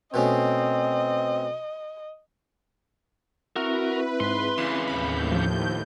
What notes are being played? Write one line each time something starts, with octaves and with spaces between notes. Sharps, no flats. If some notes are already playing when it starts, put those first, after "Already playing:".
B2 A3 C4 C#4 D#5
C4 E4 F#4 A#4 B4 E5
G#2 C6
C#3 E3 C6
D#2 A2 B5 G6
F3